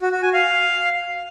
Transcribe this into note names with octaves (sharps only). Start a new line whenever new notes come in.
F#4
F#4
G#5
F5